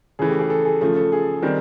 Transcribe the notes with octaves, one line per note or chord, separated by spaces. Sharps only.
C#3 E3 A3 G#4
G4
G#4
A4
G#4
C#3 F3 A3
A4
G#4
D#3 G3 C4